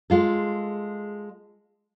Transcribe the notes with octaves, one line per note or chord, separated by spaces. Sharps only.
G#3 F4 A4